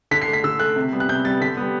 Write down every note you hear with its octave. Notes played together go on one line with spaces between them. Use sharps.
D3 B6
C7
A3
B6
D3 E6
A3 F#6
C3
G3 B3
F#6
C3 G6
G3 B3 A6
D3 B6
G3 B3